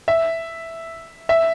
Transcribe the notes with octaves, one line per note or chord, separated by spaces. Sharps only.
E5
E5